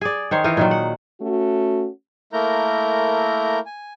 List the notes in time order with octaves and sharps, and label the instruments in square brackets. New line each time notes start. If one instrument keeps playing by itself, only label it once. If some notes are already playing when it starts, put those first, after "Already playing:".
[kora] G#4 D5
D#3 C5 C#5
E3 D#4 F4
A#2 D#3 F#3
F#5
[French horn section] A3 C#4 F#4
[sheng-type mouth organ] A3 A#3 E4 A#4 A#5 G6
G#5